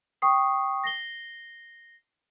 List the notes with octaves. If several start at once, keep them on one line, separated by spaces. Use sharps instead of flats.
G5 C#6 D#6 C7
A#6 C7 G7